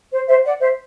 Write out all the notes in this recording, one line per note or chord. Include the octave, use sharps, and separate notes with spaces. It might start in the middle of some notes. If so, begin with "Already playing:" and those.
C5
C5 E5
D5 F#5
C5 E5